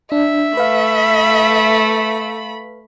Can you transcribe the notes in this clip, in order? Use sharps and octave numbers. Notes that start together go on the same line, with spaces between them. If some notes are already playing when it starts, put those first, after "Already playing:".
D4 E5
A3 B4 F5 B5